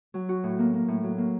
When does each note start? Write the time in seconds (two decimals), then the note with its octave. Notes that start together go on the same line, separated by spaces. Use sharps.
0.14 F#3
0.29 F#4
0.44 A2
0.59 A#3
0.74 A#3
0.88 A2
1.03 F#3
1.18 A#3